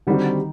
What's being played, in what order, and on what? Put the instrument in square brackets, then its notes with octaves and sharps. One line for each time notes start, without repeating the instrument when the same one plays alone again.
[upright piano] D3 G3 C4 F#4 [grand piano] D#3 D#4